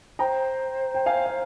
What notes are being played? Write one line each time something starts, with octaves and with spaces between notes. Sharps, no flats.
C5 G5 A#5
G5
F5 G#5
F5